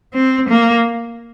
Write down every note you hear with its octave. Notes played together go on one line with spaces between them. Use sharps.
C4
A#3